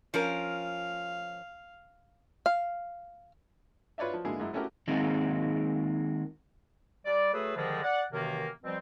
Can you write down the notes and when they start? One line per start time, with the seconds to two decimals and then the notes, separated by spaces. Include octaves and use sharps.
0.14 F3 C#4 A#4 F5
2.46 F5
3.98 F4 B4 C#5 D5 E5
4.14 F3
4.25 D3 G#3 A#3 E4 G#4
4.40 F#2 G#3 E4
4.53 A3 C#4 E4 F#4 G4 A#4
4.88 D#3 F#3 G#3 A#3 C4
7.06 G3 D5
7.33 F#3 A3 G#4 A4 B4
7.56 G#2 D3 D#3 F3 G3 G#3
7.83 D5 F#5
8.13 F#2 C3 D#3 E3 A#3
8.64 B2 F3 G3 C4